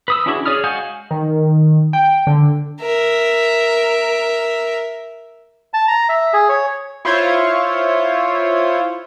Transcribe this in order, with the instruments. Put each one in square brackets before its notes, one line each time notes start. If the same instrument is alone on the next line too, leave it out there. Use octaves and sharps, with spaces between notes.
[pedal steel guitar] B4 D#6 E6
C#4 D4 E4 F#4 G#4
G#4 C#5 D5 D#6 F6
G#3 F#4 F5 G#5 G6
[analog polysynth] D#3
G5
D3
[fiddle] A#4 E5
[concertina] A5
A#5
E5
G#4
C#5
[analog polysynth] E4 F4 C5 C#5